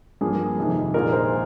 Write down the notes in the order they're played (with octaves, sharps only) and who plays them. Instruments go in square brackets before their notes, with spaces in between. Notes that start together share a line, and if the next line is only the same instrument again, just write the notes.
[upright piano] G2 F3 A#3 [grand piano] G#4
[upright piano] F2 C3 D#3
[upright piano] A#1 A#2 G#3 D#4 G4 [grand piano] A#4
[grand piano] C5